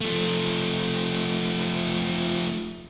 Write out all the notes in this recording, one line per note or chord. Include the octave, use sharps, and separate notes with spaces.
F3 A3